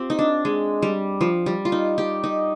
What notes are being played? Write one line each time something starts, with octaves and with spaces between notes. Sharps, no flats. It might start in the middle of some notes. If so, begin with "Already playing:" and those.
Already playing: C4 F4 G4
D#4
D4
G#3
G3
F3
G3
F4
D#4
G4
D#4